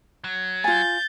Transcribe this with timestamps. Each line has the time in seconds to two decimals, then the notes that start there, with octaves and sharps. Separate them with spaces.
0.24 F#3
0.64 F4 G#5 G6 A6